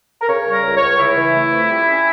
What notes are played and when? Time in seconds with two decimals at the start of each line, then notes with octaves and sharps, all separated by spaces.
0.21 A#4
0.29 C#3 C#5
0.47 G3
0.53 A#4
0.65 C#2
0.76 C#5
0.82 C#2
0.99 C#3 E4
1.17 E3
1.35 A3
1.52 F2
1.70 G3
1.87 C#4